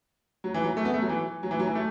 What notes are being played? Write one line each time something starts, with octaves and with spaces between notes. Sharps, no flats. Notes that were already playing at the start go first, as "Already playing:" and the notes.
F#3
E3
F#3
A3
B3
A3
F#3
E3
F#3
E3
F#3
E3
A3